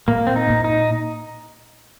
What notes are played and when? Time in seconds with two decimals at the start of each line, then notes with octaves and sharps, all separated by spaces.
0.08 A#2 A#3
0.27 C4
0.36 D#4
0.50 A#2
0.64 D#4